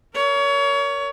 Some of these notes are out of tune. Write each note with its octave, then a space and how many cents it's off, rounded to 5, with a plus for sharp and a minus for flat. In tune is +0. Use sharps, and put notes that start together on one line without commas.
A#4 +0 C#5 +25